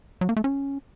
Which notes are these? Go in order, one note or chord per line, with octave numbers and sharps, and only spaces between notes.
F#3
A#3
A3
C#4